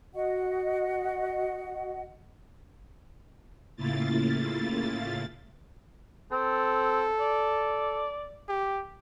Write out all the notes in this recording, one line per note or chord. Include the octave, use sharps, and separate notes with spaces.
F#4 D#5 F#5
A2 C#3 A#3 E4 F4 A6
C4 A4
D5
G4